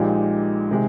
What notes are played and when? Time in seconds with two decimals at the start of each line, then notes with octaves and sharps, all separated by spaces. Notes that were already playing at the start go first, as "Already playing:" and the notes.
Already playing: A#1 A#2 G#3 D#4 G4
0.71 C3 D#3 G#3